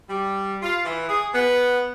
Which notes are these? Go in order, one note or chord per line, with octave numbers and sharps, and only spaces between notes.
G3
F4
E3
G#4
B3